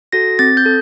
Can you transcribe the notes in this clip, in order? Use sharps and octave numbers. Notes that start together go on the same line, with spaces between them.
F#4 A4 A#6
C4 A6
G6
A4